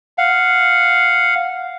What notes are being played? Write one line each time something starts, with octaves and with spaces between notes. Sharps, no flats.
F5 F#5